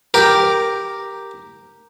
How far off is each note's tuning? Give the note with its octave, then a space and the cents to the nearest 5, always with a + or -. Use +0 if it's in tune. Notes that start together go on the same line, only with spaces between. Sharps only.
G4 +0 A#4 +0